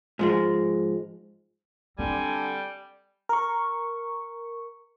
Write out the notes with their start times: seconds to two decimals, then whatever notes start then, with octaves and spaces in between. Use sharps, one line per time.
0.19 G#2 F3 G#3
1.99 D3 G3 C4 G#5
3.29 A#4 C#6